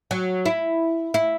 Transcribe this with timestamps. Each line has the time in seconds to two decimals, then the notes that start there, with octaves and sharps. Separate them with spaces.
0.11 F#3
0.46 E4
1.14 E4